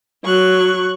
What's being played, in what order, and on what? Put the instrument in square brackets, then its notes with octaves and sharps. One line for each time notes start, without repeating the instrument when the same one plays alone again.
[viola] F#3 [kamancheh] C#6 F#6